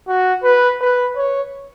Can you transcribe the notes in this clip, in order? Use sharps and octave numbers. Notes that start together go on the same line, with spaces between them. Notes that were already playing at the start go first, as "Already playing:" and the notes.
F#4
B4
B4
C#5